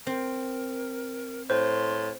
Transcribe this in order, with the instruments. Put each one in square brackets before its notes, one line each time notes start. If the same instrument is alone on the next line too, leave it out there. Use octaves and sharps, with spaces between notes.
[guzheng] C4 [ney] A#4
[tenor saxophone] A2 [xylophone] C5 [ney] C6